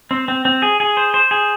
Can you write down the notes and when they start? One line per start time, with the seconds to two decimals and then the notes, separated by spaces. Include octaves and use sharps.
0.11 C4
0.28 C4
0.45 C4
0.62 G#4
0.80 G#4
0.97 C5
1.14 C5
1.31 G#4